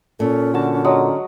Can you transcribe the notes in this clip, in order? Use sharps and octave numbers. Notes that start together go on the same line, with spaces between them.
A#2 C#4 A4
D3 F#4 A5
F#3 G#3 D#6